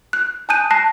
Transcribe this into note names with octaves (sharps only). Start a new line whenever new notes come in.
F#6
G#5 A5 D#6 F#6 G6 D#7
A5 F#6 A#6 C7